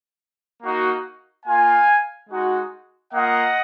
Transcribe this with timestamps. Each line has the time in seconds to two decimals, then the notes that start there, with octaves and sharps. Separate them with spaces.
0.63 A#3 D#4 F#4
1.46 A#3 F4 F5 G#5
2.30 G#3 D#4 F#4
3.14 A#3 F4 D#5 F#5